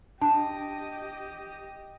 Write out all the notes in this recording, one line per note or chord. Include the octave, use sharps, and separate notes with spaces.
D4 G4 D#5 A5